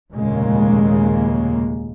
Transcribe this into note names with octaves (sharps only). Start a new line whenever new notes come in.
F1 D#2 A#2 C#3 G#3 A#3